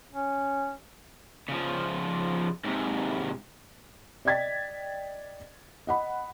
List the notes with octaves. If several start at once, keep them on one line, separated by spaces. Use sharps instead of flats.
C#4
C#3 F3
G#2 C3
D5 D#5 G5 G#6 A6 B6
D#5 F#5 B5